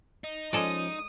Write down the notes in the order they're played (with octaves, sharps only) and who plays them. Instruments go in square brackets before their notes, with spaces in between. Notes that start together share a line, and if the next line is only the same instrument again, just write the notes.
[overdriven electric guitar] D#4
[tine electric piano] F3 C#4 [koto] G#3 A4 D5 [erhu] D#6